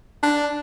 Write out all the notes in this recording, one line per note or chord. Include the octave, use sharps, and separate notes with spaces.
D4